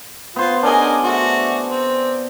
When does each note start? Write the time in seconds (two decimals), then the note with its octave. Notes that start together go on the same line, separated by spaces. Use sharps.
0.36 B3 F4 C5
0.63 C#4 D4 G#4 A#4 D#5
1.03 A3 F#4
1.68 C4